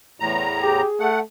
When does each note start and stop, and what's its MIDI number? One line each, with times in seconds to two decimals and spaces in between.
0.20 0.82 40
0.20 0.82 45
0.20 0.82 82
0.62 0.87 67
0.62 1.07 68
1.00 1.22 57
1.00 1.20 78